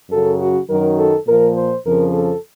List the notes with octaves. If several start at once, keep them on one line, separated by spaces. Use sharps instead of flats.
F#2 C#3 F#3 A4
F#4
F#2 D#3 F#3 A#4
A4
A#2 F3 A#4
C5
F2 C#3 F3 A#4
A4